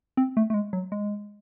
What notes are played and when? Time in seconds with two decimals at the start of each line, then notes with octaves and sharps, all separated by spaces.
0.17 C4
0.37 A3
0.50 A3
0.54 G#3
0.73 F#3
0.92 G#3